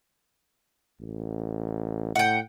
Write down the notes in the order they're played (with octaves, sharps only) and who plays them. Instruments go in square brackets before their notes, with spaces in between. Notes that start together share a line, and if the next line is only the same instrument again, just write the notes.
[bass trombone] A1
[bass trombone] A2 [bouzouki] F#5 G5